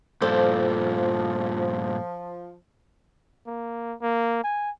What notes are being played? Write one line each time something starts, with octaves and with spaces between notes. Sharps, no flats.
G2 A#2 F3 A4 C5 D5
A#3
A#3
G#5